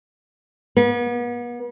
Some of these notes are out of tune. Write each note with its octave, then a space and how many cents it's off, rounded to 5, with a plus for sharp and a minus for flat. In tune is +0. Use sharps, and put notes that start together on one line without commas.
B3 -40